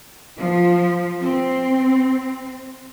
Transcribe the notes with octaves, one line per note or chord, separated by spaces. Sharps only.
F3
C4